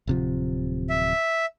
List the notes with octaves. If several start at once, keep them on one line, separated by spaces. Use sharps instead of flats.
D1 C3 F3
E5